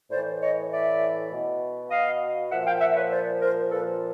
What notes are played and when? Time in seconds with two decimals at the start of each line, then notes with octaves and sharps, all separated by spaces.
0.11 A2 E3 C5 D5
0.42 C#5 D#5
0.72 D5 E5
1.31 B2
1.91 D#5 F5
2.51 A#2 F3 E5 F#5
2.66 F5 G5
2.81 E5 F#5
2.96 B4 C#5
3.11 C5 D5
3.41 A#4 C5
3.71 A#2 F3 A4 B4